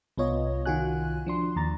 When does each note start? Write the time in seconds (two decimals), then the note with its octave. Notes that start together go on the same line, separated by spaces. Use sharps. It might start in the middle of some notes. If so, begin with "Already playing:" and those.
0.18 C2 B3 F4 C#5 D#5
0.66 C2 D#3 F4 F#4 G#5 F#6
1.26 F3 D4 C6
1.56 D#2 A#5 A6